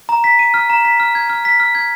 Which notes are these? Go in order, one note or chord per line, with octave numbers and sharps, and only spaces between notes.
A#5
B6
D#7
F6
A#5
B6
F6
G#6
F6
B6
F6
G#6